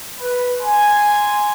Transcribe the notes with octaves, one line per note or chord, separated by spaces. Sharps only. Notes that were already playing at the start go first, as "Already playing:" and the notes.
B4
G#5 C6